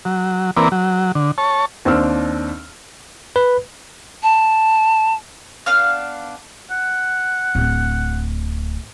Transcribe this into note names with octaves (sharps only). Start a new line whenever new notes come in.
F#3
E3 A#3 C4 A#4 B4 D5
F#3
D3
C#5 A5
D#2 C4 D4 E6 F6
B4
A5
B3 D4 F5 F6
F#5
D1